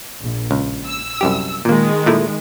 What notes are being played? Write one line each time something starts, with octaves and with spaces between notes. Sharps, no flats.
A#1
C#2
E6
C2 F#2 G4
A#2 D#3 G#3 A#3
A#2 A3 E4